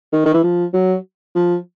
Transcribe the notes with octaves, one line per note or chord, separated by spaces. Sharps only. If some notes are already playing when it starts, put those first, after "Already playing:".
D#3
D#3
E3
F3
F#3
F3